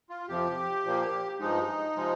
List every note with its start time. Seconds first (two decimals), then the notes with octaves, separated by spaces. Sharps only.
0.10 F4
0.28 F2 C3 F3 G4
0.84 A#2 F3 A#3
1.40 G2 F3 G#3 D#4
1.96 C3 F3 G#3